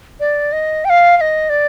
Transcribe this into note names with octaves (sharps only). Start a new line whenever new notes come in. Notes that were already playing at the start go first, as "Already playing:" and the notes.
D5
D#5
G5
F5
F5
D#5
D5